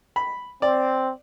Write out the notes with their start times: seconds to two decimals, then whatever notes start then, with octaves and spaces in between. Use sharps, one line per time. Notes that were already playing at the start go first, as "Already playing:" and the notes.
0.16 B5
0.62 C4 D5